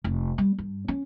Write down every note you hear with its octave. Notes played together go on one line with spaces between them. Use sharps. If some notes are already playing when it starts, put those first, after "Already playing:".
F1
G3
G2
C#4